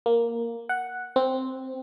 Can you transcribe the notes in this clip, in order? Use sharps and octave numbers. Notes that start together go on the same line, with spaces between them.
A#3
F#5
C4